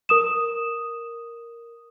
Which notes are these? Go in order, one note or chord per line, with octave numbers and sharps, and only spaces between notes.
A#4 D#6 E7